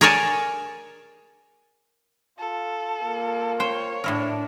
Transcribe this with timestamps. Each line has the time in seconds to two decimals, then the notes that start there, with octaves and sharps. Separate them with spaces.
0.01 G#4 A#4 C#5 D5 G#5 A5
2.39 F4 A4
3.03 A#3 F4
3.60 C5 C#5 G5
4.04 A2 D4 E4 A#4